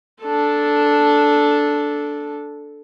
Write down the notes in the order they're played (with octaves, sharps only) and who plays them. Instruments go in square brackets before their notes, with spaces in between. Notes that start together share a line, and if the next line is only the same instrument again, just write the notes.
[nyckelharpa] D4 A4